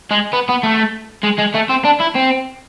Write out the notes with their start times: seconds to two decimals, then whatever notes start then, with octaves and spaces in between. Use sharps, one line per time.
0.11 G#3
0.33 B3
0.49 B3
0.63 A3
1.24 G#3
1.39 G#3
1.55 A3
1.70 C4
1.84 D4
2.00 E4
2.15 C4